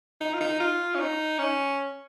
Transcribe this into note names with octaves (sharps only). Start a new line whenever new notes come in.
D#4
F4
D#4
F4
C#4
D#4
C#4